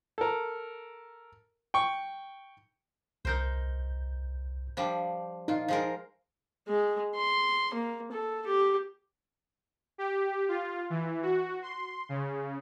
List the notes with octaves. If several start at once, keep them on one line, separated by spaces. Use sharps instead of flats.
A4 A#4
G5 C#6
C2 D#4 A#4 C5 G6
F3 G3 D4
A#2 D#4 F4
F3 G#3 A#4
G#3
C6
A#3
A4
G4
G4
F4
E3
F#4
C6
C#3